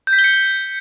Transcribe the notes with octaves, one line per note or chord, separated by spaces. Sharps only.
G6
B6
G7
C#7